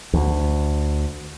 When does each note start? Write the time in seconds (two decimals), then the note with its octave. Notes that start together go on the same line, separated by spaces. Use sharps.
0.13 D2